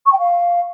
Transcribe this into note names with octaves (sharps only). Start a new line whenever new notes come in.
C#6
G5
F5